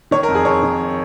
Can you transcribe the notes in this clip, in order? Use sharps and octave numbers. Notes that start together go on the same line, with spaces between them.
D#3 C#5
A#4
F2
G#4
F2 C#5
D#3